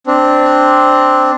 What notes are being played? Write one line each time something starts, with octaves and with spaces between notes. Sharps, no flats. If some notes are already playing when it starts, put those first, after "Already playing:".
C4 D4